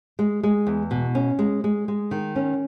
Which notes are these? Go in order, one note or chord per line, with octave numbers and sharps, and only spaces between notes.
G#3
G#3
E2
B2
C#4
G#3
G#3
G#3
D#3
C#4